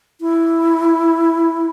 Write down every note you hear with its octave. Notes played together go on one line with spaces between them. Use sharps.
E4